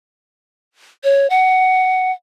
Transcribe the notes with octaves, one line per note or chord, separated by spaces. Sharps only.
C#5
F#5